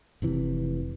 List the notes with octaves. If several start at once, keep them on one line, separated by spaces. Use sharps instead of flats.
F1 C3 E3